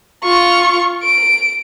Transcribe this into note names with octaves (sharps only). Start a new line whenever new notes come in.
F4 C#6
D7